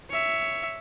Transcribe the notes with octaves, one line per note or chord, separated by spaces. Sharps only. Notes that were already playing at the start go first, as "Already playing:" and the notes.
C#5 E5